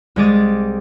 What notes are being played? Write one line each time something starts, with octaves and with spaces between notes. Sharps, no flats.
C2 G#3 G#4 D6 A6